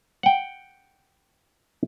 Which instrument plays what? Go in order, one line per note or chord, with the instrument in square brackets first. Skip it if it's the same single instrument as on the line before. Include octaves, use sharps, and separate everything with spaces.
[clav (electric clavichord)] F#5 G5